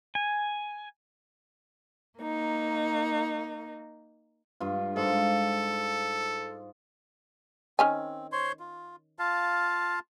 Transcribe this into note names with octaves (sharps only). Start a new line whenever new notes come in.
G#5
A#3 D#4
G2 F4
G#2 A4 F5
D#3 C4 C#4 G#5
C5 C#5 C6
F4
F4 F5 A5